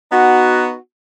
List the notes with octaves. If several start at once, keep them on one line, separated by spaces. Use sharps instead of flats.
B3 D#4 F#4